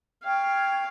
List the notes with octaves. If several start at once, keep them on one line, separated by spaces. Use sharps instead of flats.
F5 G5 C#6 G#6